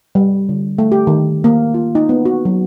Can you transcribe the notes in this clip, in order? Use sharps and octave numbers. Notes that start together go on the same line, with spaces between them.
G3
D3
A3
G4
D#3
A#3
F4
D#4
B3
F#4
F#3